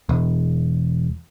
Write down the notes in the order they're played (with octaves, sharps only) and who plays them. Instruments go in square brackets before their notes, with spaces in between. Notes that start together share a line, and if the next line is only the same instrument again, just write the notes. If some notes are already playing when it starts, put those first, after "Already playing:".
[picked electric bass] E1